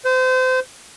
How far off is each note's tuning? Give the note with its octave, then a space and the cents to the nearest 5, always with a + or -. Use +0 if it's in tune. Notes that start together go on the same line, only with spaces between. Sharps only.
C5 -30